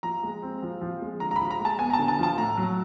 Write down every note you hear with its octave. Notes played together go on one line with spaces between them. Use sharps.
F3 A#5
G#3
C4
F3
F3
G#3
D3 A#5
A#5
B5
F3
A#5
G#3 A5
B3 G#5
A#5
A5
D3
A5
F3 A5
A2 A#5
F#3